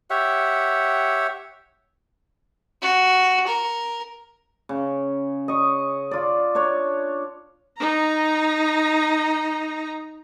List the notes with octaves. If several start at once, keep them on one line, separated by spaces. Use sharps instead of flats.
G4 C#5 E5 F#5
F#4
A#4
C#3
D#5 C#6
F4 D5
D4 C#5
D#4 A#5